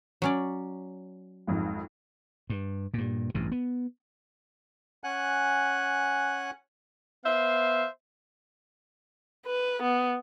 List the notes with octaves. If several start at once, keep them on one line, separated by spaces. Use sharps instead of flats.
F#3 C#4 D5
G#1 F2 G#2
G2
G2 A#2
A1 G2 C3
B3
C#4 F#5 G#5 F#6
B3 C5 E5 F5
B4
B3